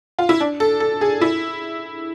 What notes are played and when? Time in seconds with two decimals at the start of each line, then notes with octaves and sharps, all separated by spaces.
0.19 F4
0.29 E4
0.40 D4
0.60 A4
0.80 A4
1.01 G#4
1.21 E4